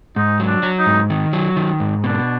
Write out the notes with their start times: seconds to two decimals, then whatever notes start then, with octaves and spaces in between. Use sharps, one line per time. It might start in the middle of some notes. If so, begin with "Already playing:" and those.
0.16 G#2 D#4
0.39 F#3
0.47 D4
0.63 F#3
0.79 D#4
0.86 G#2
1.10 D#3
1.33 F#3
1.56 D#3
1.80 G#2
2.04 B2 D4